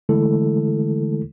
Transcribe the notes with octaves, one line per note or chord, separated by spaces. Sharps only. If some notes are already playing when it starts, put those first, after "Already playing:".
D3 E3 G#3 A3 E4 A4